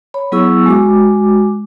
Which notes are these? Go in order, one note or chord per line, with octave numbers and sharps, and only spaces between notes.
C#5 B5
F#3 B3 E4 G#4 C#6 E6
G#3 F#4 D6